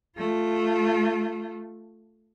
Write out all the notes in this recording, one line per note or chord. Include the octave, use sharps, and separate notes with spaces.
A3 F4